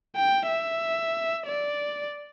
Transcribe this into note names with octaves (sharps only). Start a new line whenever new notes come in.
G5
E5
D5